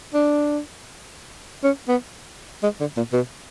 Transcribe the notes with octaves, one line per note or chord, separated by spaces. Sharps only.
D4
C#4
B3
G#3
D3
A#2
B2